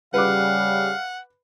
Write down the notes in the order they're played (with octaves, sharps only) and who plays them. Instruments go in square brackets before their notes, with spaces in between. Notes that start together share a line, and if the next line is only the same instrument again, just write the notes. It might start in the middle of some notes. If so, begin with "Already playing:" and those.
[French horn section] C#3 G3 [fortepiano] B4 D6 [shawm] F5 [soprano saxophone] F#5